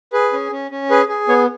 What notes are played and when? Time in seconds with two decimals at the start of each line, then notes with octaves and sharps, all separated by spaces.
0.13 G#4 B4
0.33 C#4
0.52 C#4
0.71 C#4
0.90 G#4 B4
1.09 G#4
1.28 B3 C#5